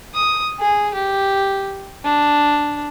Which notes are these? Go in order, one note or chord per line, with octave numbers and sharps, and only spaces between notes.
D#6
G#4
G4
D4